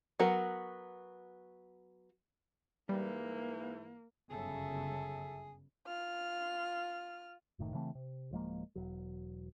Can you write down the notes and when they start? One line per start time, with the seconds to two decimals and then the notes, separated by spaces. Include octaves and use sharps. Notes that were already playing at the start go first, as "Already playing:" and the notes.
0.19 F#3 B3 F#4 A#4 A#5
2.89 G#2 E3 G3 A#3
4.30 G1 F#2 C#3 G#4 A4 E5
5.87 F4 F6
7.59 F#1 A2 D#3
7.74 C#3 E3 A3 C4
7.95 C3
8.31 D1 F3 G#3 A#3
8.75 E1 F#3